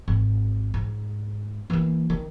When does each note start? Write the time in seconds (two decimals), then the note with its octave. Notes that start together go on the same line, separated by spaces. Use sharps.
0.08 G#1
0.74 G#2
1.70 E3 A#3
2.10 D#3